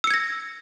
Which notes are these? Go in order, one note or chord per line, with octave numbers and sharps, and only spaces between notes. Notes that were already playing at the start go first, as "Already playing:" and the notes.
E6 G#6 A#6 C#7